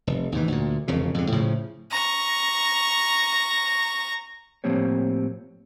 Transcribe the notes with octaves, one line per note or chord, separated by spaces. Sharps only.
F1
D#2 G#2 E3
D2 A#2
E1 F2 C#3
F2 G#2 D3
A2 C#3 F3
A#5 C#6
A2 F3 A#3 C4 G4 C#5